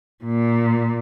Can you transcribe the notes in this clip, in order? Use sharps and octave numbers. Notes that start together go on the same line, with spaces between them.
A#2